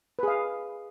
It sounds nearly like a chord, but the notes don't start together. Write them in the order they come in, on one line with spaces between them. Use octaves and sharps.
B4 G#4 F5